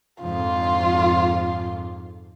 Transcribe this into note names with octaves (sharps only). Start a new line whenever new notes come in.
F2 G#2 D3 F4